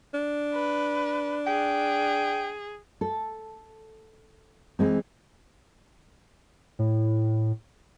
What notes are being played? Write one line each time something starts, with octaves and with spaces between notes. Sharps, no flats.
D4
B4
G#4 G5
A4
E3 G#3 C4
A2